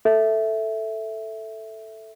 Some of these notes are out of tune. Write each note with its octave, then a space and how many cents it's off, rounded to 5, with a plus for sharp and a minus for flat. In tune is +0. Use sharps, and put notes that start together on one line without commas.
A4 +0 E5 +0